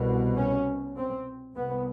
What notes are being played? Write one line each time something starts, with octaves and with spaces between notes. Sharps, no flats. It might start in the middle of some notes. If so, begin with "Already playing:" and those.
Already playing: C2 B2
C#4
C4
C2 C3 B3